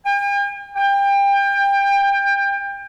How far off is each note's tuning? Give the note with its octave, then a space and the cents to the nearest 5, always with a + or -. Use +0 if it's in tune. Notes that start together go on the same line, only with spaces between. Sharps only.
G5 +45
G5 +25